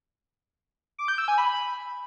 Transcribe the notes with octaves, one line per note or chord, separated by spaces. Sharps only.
D6
G6
E6
G#5
B5